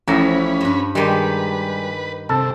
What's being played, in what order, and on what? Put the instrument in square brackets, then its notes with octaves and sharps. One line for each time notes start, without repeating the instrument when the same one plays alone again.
[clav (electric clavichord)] A1 A2 A#5 [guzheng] F3 [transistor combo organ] C#4 B5
[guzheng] G2 B4
[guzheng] D#3 G4 [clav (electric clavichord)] G3 G#3 [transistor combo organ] B4
[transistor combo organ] C3 [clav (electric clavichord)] A4